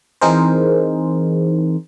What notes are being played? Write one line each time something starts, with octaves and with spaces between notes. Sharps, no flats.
E3 C4 D#4 G#4 A#4 C5